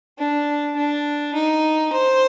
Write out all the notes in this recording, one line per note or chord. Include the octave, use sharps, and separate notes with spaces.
D4
D4
D#4
C5